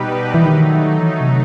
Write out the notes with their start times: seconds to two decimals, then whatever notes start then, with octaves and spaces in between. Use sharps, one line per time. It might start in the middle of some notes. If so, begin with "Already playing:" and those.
Already playing: B2 G3 D#4 G4 B4
0.34 E3
0.43 D#3 F#3 A3 D#4
0.98 E3
1.09 D#3
1.21 C3